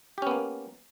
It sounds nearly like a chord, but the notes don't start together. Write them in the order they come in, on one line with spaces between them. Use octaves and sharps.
G4 C#4 B3 A#3